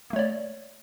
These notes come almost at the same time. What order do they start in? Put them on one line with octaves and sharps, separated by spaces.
A#3 A3 C#5 D5